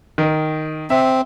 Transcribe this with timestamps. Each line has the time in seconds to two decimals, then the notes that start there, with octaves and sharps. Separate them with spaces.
0.18 D#3
0.90 C4 E5